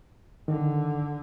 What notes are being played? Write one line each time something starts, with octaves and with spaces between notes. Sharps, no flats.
D3 D#3